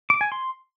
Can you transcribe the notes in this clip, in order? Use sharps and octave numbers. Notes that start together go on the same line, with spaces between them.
D6
G#5
C6